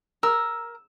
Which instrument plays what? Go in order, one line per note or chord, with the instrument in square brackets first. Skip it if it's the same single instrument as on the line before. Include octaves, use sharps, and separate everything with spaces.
[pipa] A#4 [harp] E6